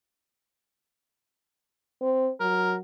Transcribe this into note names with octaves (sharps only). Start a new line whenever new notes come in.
C4
F#3 A#4